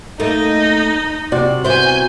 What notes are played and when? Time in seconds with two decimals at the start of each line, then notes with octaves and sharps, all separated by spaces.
0.20 A3 A#3 D#4 D#5
1.32 C3 F#4 D5
1.65 B3 E4 C5 G#5 G6